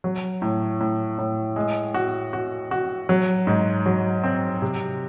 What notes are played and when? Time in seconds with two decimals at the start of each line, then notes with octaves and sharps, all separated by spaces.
0.04 F#3
0.42 A2
0.80 A2
1.18 A2
1.56 G#3
1.94 F#4
2.33 F#4
2.71 F#4
3.09 F#3
3.47 G#2
3.86 F#3
4.24 C4
4.62 C3